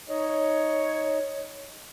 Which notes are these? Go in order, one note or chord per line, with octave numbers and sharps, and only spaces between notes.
D#4 C#5 D#5